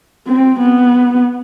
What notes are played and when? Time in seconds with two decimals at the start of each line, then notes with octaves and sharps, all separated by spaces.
0.27 C4
0.60 B3